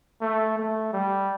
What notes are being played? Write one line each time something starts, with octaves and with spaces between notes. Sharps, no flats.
A3
A3
G3